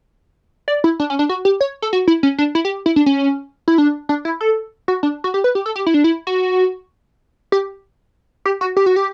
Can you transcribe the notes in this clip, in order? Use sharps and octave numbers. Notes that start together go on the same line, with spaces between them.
D5
E4
D4
C#4
D4
F#4
G4
C#5
A4
F#4
E4
C#4
D4
E4
G4
E4
D4
C#4
E4
D4
D4
E4
A4
F#4
D4
F#4
G4
B4
G4
A4
G4
E4
D4
E4
F#4
G4
G4
F#4
G4
F#4
G4